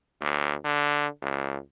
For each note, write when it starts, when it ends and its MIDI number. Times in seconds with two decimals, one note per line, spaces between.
0.21 0.55 38
0.64 1.07 50
1.22 1.58 37